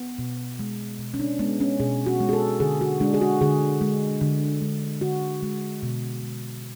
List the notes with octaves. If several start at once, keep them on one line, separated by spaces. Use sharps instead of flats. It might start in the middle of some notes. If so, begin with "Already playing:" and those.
Already playing: B3
B2
G#3
B2
C#4
D4
G#3 B3
C#4
B2 G#4
F#4
G#3
G#4
A4
D3 G#4
F#4
G#3 D4
G#4
F#4
D3 G#4
G#3
D3
G#3
D3 F#4
G#3
B2
G#3